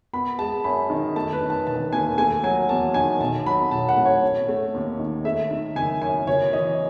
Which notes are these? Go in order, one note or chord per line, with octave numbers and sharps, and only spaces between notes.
B3 B5
G#3 A5
F#2 B5
D#3
A3 A5
B4
D#3
A5
E1 A5
D#2 G#5
A3 G#5
F#3 G#5
E2 A5
D#3 G#5
B1 A5
F#3 B5
B1 A5
F#5
A2
C#5
C#4
A3
D#2
D#3
A3 E5
D#3
F#1 G#5
F#2 G#5
F#1 C#5
E3 D#5